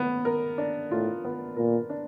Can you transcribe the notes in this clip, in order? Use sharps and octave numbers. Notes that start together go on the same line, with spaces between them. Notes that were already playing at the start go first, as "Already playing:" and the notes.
Already playing: B3
A#4
D4
A2 F4
B3
A#2 A#4
D4